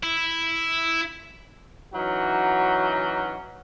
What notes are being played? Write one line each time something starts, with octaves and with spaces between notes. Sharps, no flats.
E4
E3 F#3 C#4 D#4 F#4